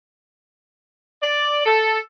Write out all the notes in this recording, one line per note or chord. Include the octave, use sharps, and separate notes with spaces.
D5
A4